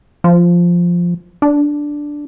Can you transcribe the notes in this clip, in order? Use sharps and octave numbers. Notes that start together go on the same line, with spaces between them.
F3
D4